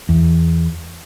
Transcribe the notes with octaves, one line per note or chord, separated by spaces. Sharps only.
E2